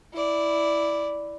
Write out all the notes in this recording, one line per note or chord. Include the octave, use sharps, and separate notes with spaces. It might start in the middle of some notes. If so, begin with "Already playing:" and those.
E4 D5